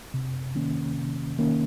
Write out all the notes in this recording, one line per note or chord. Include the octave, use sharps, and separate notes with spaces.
C3
D#3 A#3 C#4
C3
D#3 A#3 C#4